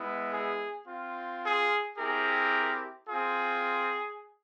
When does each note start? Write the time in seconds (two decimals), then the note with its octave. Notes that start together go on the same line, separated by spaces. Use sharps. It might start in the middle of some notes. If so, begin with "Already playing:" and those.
Already playing: G#3 B3 E4
0.31 G#4
0.86 C4 F4
1.42 G#4
1.97 C4 E4 G4 G#4 A#4
3.08 F4 G#4
3.13 C4